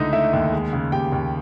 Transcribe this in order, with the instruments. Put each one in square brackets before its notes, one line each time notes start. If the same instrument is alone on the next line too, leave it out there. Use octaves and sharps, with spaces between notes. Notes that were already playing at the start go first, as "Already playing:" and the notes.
Already playing: [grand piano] C#2 D3 A3 D#4 E4 D#5 E5
A3 E4 E5
D#2
G#3
C#3
D#2 G4 G5
D#2